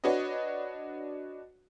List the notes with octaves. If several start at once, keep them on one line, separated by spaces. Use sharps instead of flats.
D4 F#4 B4 C#5 D#5